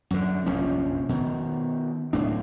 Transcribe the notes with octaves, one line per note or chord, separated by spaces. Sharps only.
F#2 D3
F1 A#1 F3 C#4
B2 D#3
D1 A2 D4